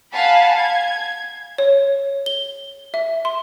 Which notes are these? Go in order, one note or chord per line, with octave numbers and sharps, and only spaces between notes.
F5 F#5 G#5 A5 B5
G#6
C#5
G7
E5
C6